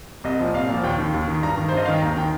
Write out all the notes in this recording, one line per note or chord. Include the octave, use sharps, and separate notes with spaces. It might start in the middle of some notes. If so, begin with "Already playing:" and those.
C2 D#5
A#2 F3
C2 F5
A#2
F3
D#2 G5
D#3
D#2
D#3
G2 A#5
D#3
C5
G2
D#5
D#3 F5
G5
D#2 A#5
D#3 G5